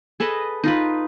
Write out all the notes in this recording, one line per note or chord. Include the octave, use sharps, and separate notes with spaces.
G#4 A4 B4 D#5
D#4 F4 B4